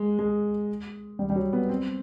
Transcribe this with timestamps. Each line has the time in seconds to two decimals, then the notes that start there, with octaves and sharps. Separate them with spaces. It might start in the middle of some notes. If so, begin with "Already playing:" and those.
Already playing: G#3
0.19 G#3
1.19 G3
1.30 G3
1.36 F#3
1.53 B3
1.69 C4